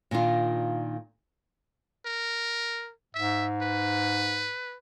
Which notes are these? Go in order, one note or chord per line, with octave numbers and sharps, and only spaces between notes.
A#2 D#3 D4 F4
A#4
G#2 E5
B4